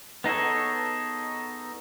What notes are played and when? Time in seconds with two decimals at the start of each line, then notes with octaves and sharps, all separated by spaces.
0.24 B3 D#4 G#4 A4 C#5